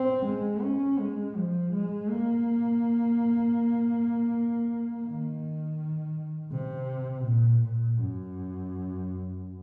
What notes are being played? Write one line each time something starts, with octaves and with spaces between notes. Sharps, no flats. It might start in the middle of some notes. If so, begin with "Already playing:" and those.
Already playing: C4
G#3
C#4
G#3
F3
G#3
A#3
D#3
C3
A#2
A#2
F#2